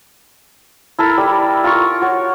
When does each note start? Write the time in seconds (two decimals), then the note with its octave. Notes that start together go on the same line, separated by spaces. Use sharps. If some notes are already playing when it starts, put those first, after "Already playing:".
0.99 E4 A4 A#4 E6
1.18 G3 E4
1.64 F4 A#4 C#6
2.01 F#4 C#5